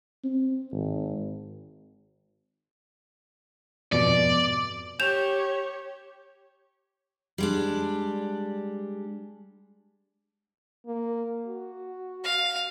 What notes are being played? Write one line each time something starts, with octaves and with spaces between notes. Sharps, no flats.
C4
G#1
F2 G#2 B2 D5
G4 C#5 G6 E7 F7
G3 G#3 D4
A#3
F#4
F5